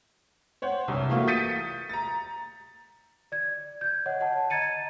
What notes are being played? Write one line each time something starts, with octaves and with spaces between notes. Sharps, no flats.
C5 C#5 F#5
C2 G2
E3 A3 A#3 F4 F#4
D#6 G6 A6 B6 C#7 D#7
A#5 A6
D5 G#6
G6 G#6
C#5 D#5 F#5
D#5 F#5 A5
D#5 A#5 G#6 A6 C#7 D#7